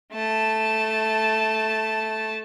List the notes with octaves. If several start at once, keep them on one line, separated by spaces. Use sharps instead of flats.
A3 A5